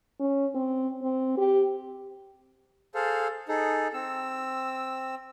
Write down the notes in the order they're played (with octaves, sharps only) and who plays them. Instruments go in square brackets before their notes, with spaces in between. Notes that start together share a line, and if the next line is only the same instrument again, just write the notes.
[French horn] C#4
C4
C4
G4
[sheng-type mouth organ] G#4 A4 C5 F5
D#4 G#4 A4
C4 E6